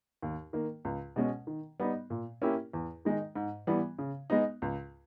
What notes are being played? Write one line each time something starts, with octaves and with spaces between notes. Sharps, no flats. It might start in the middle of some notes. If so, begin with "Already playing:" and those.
D#2
D#3 A#3
C#2
B2 G#3 C#4
D#3
G3 B3 D#4
A#2
A#3 C#4 E4 G4
E2
D#3 G#3 D#4
G#2
E3 G3 B3
C#3
G#3 B3 D#4
C#2